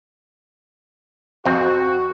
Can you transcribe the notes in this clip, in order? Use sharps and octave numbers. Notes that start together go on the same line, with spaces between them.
F2 C4 F#4